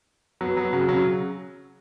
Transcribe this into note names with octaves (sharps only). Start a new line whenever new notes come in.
F#3 B3
F#3 B3
C#3 F#3
C#3 F#3